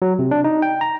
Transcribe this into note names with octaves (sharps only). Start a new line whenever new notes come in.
F#3
C3
D4
D#4
G5
A#5